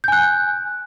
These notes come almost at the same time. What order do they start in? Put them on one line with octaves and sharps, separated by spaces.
G6 G#5 F#6